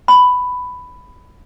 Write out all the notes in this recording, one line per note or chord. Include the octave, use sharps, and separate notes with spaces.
B5